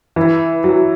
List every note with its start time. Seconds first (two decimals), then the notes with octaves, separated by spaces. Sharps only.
0.16 E3
0.64 F#3